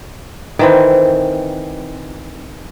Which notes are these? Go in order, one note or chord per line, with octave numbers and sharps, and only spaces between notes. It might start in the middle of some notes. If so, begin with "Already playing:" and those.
D#3 E3 C4